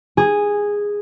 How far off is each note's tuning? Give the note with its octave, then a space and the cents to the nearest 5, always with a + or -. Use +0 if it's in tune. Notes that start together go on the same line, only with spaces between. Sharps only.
G#4 -10